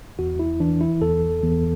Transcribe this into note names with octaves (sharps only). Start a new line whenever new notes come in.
E2 F#4
E4
E3 D4
E4
E2 A4
E2